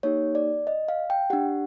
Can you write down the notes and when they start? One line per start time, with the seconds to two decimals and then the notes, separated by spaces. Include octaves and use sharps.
0.03 A#3 D#4 G4 C#5
0.35 D5
0.67 D#5
0.88 F5
1.10 G5
1.30 D4 G4 F#5